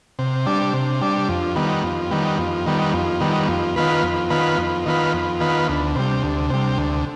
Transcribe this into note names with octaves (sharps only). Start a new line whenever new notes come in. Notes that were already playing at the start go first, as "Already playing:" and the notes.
C3
G3 D4
C3
G3 D4
F2
D#3 G3 B3
F2
D#3 G3 B3
F2
D#3 G3 B3
F2
D#3 G3 B3
F2
D#3 B3 F4 B4
F2
D#3 B3 F4 B4
F2
D#3 B3 F4 B4
F2
D#3 B3 F4 B4
D2
C3 G3
D2
C3 G3
D2